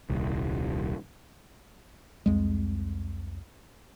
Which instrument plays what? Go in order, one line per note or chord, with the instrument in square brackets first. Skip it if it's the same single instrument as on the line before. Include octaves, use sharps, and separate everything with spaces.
[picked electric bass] D#1 C2
[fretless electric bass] C2 F2 G#3